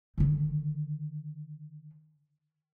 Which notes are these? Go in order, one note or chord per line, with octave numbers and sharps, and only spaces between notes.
D3 D#3